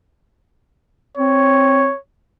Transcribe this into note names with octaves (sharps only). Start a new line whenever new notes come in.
C4 C#5